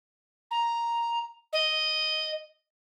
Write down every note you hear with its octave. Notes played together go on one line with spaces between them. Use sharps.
A#5
D#5